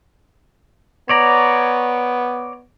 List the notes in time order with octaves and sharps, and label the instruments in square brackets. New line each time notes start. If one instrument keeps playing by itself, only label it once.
[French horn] B3 [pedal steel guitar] C#5 D5 A#5